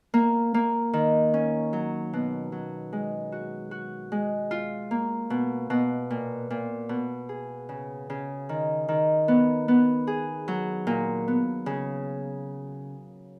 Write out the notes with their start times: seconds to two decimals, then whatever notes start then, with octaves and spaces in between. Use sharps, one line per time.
0.14 A#3
0.54 A#3
0.93 D#3
1.34 C#4
1.73 F#3
2.13 B2
2.52 F#3
2.93 G#3
3.32 F#4
3.71 F#4
4.12 G#3
4.51 F4
4.91 A#3
5.30 B2
5.70 B2
6.10 A#2
6.50 A#2
6.89 B2
7.29 G#4
7.69 C#3
8.10 C#3
8.49 D#3
8.88 D#3
9.28 B3
9.68 B3
10.07 G#4
10.48 F#3
10.87 A#2
11.28 B3
11.66 C#3